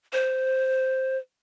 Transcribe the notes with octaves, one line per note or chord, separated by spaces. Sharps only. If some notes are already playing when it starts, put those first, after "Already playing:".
C5